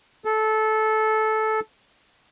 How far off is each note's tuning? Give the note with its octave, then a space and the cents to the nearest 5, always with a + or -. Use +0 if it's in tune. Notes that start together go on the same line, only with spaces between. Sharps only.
A4 -15